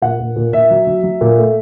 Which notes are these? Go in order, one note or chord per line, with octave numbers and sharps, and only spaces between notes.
A#2 F#5
A#2
A#2
A#2 E5
F#3
F#3
F#3
A#2
A3